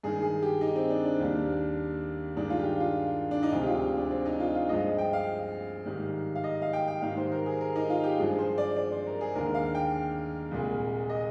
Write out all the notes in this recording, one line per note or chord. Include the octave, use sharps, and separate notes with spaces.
G2 D#3 G#3 G#4
G#4
G4
D#4
C4
D4
D4
D#2 D#3 G3
G2 D#3 G#3 D4
F4
G4
F4
F4
D4
D#4
D2 C3 F3 G#3 F4
G4
F4
D4
C4
D#4
F4
F4
G2 F3 G#3 D#5
G5
F5
G#2 D#3 G3
F5
D#5
F5
G5
G5
G#2 D#3 G3 F5
C5
A#4
G#4
A#4
D#4
F4
G4
G2 F3 G#3 G#4
C5
D5
D5
C5
A#4
G#4
D#2 D3 G#3 A#4
F5
G5
C2 A#2 G#3
D#5